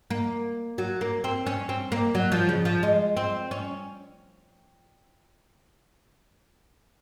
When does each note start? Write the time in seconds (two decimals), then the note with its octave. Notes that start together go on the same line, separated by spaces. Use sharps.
0.10 A#3
0.78 F#3
1.01 A#3
1.24 C4
1.46 C#4
1.69 C4
1.92 A#3
2.15 F#3
2.32 F3
2.49 C#3
2.65 F3
2.83 G#3
3.17 C4
3.51 C#4